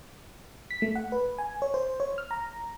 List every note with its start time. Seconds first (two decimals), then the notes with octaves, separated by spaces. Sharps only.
0.71 B6
0.82 A3
0.95 F#5
1.12 B4
1.38 G#5
1.62 C#5
1.74 C5
2.00 C#5
2.18 F6
2.31 A#5